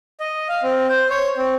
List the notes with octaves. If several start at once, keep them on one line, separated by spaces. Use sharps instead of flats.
D#5
F5
C4
C5
C#5
C4